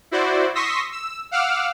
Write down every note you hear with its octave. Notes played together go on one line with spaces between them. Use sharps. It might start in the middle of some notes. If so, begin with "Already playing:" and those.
E4 F#4 C5 D5
C6 C#6 D#6 E6 A#6 B6
E6
F5 F#5 D6 E6 F6